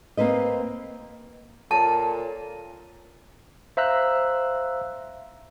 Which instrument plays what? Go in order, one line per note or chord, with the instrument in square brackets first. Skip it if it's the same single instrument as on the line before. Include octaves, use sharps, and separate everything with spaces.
[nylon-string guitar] A#3 C4 B4 D#5
[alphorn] A#2 [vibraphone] A4 A#4 C#5 [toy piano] A5
[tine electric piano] C5 E5 F5 A#5 E6 F#6